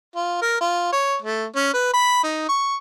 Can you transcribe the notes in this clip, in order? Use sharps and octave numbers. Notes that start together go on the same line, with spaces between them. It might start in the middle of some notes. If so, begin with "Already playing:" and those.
F4
A#4
F4
C#5
A3
C#4
B4
B5
D#4
C#6